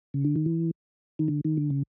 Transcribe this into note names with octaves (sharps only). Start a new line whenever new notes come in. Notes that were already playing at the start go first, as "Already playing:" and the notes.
C#3
D3
D#3
E3
D#3
D3
D#3
D3
C#3